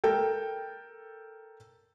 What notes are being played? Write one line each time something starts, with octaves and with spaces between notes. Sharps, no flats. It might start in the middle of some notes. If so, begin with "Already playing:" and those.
A4 A#4 G5